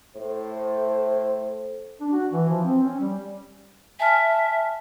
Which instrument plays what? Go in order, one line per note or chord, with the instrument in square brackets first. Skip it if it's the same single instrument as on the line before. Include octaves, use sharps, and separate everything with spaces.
[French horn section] A2 A4 C5
[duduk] D4
F#4
E3
F3
C4
C#4
G3
[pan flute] E5 [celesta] G#5 A5 F6